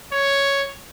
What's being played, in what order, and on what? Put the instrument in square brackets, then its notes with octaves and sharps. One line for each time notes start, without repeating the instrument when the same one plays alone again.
[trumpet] C#5